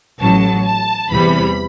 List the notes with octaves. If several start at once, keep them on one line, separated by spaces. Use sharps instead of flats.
A1 A2 F#3 A5
A5
E2 C3 E3 G3 B5